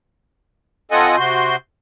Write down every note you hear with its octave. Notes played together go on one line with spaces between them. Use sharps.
C4 F4 A4 D#5 F#5 G#5
C3 F#4 C6 G6